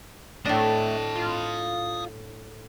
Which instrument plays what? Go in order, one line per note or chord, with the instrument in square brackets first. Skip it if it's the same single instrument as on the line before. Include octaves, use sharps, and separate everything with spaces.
[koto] A2 D4 [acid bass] A3 [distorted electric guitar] D#5 A5
[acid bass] F4